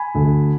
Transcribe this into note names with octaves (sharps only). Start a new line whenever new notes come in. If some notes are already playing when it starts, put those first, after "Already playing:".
Already playing: G#5 B5
D2